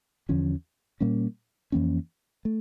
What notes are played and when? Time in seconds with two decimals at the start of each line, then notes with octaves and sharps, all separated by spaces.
0.29 E2 D3 F3 C#4
1.01 A#2 G3 A#3 C#4
1.72 F2 E3 A#3 C#4
2.45 A3